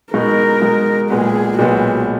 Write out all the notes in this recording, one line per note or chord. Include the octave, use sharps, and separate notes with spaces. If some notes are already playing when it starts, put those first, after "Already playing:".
B2 G#3 D#4 A#4
B2 G#3 D#4
B1 A#2 G#3 B3 G#4
B1 A#2 G#3 B3 F#4